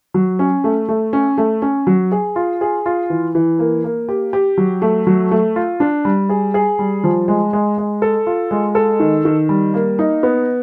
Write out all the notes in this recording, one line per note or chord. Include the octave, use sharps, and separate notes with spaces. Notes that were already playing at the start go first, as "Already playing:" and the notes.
F#3
C#4
A3
A3
C#4
A3
C#4
F#3
G#4
F4
G#4
F4
E3
E3
A#3
A#3
G4
G4
F#3
A3
F#3
A3
F4
D4
G3
G#4
G#4
G3
F3
G#3
G#3
G#3
A4
F4
G#3
A4
D#3
D#3
G3
A#3
D#4
B3